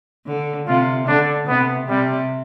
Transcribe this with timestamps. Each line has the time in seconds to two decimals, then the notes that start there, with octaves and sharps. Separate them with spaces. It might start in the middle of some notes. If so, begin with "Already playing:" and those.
0.27 D3
0.67 C3 F4
1.08 D3 D4
1.48 C3 B3
1.88 C3 G3